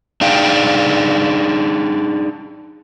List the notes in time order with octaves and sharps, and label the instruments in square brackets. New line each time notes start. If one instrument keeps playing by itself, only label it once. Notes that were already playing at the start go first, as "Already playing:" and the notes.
[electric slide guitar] D4 D#4 G#4 F5 G5